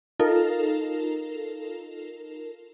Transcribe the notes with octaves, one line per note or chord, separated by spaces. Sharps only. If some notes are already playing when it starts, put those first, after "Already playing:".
D#4 F4 A4 A#4